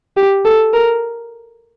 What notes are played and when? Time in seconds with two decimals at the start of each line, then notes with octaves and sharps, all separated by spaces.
0.17 G4
0.45 A4
0.74 A#4